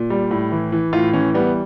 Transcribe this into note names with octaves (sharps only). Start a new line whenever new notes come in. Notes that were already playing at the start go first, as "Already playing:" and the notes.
Already playing: A#2
G3
A2
E3
E3
A2 F4
E3 C#4
G3 B3